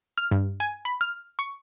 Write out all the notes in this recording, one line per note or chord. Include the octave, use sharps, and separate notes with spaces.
F6
G2
G#5
B5
F6
C#6